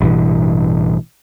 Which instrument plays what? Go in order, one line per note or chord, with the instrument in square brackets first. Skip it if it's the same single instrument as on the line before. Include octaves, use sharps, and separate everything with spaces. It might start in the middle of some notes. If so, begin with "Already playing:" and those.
[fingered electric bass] A1 G2 B2 E3